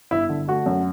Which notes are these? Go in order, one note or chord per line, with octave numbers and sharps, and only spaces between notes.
G1 E4
D3
A3 F#4
F#2